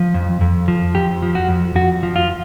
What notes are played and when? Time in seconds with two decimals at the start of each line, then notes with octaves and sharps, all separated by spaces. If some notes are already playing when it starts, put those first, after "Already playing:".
Already playing: F3
0.14 F2
0.41 F2
0.68 F3
0.95 F2 G4
1.22 F3
1.35 F#4
1.49 F2
1.75 F2 F#4
2.03 F3
2.16 F4